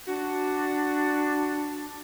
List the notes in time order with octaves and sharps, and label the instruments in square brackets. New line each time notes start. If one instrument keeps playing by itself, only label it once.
[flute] D4 [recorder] F#4